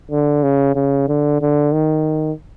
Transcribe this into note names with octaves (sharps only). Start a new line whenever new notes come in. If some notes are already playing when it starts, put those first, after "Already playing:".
D3
C#3
C#3
D3
D3
D#3